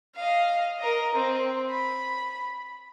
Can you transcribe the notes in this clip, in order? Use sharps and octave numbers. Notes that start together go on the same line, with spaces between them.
D#5 F5
A#4 D#5
C4
B5